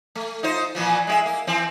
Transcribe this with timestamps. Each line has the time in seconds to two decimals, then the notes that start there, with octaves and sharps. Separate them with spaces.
0.15 A3
0.43 D#4 F4 C5
0.75 A#2 E3 F3
1.07 G#3 G4 E5
1.26 A#3
1.47 E3 C4